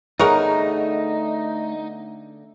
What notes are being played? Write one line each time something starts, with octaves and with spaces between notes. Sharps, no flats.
D3 A3 B3 D#4 G#4 A#4 C#5 F#5